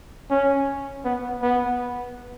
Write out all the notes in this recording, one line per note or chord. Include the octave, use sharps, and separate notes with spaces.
C#4
B3
B3